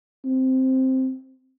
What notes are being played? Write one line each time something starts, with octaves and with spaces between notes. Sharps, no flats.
C4